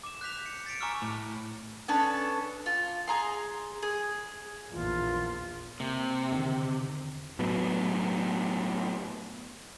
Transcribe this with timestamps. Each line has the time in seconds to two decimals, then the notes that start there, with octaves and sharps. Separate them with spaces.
0.03 D6 E7
0.21 F#6 G6 B6 F7
0.46 C#7
0.66 A6 B6 C#7 D7
0.81 G#5 A#5 C#6 D6 E6 F6
1.02 A2
1.88 B3 C#4 D4 A4
2.66 F4
3.08 G#4 A#5 C6
3.83 G#4
4.71 A#1 E2 F4
5.80 C3 A#3
6.32 E2 D3 D#3
7.39 A2 F#3 B3